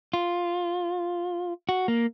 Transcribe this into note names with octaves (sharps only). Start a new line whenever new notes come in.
F4
F#4
A#3